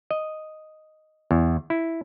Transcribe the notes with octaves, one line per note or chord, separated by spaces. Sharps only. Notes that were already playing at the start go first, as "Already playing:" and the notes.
D#5
E2
E4